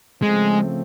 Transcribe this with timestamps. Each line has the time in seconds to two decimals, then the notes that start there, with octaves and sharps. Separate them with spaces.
0.22 C#3 F3 G#3 A3 C4